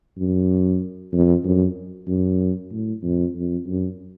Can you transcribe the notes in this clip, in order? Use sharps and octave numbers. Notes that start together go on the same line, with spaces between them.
F#2
F2
F#2
F#2
A2
F2
F2
F#2